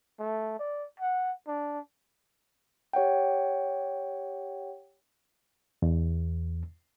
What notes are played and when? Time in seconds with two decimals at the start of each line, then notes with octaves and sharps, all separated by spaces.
0.19 A3
0.59 D5
1.00 F#5
1.47 D4
2.93 G4 C#5 F#5 G5
5.82 E2